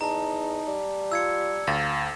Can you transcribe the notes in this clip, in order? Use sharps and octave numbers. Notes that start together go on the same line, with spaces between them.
E2 D#4 A5 A#5
G3
F4 E6 G#6 C#7
D2 F5 A6